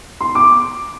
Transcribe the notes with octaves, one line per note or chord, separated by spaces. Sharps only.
C6
D6